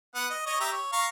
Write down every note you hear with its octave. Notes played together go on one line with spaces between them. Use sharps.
B3 F#5
D#5
C#5 D#5
G4 E5 A#5
C#5
F5 A#5 C#6